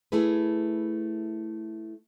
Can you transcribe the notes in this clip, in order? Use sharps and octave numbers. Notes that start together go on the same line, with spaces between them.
A3 E4 G#4 B4